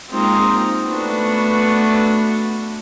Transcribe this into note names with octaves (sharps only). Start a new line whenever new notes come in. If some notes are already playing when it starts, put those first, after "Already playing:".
G#3 A#3 C4 D#4 F4 C5
A3 B3 D4 F#4 B4